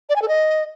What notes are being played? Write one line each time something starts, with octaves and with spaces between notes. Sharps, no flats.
D5
G#5
A4
D#5